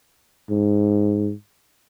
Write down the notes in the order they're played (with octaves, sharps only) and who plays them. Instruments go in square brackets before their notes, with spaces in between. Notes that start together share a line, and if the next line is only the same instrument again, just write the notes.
[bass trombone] G#2